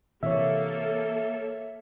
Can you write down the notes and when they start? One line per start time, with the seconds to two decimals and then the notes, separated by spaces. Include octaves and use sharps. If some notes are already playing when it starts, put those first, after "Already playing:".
0.23 C3 E3 A#3 A4 C#5 E5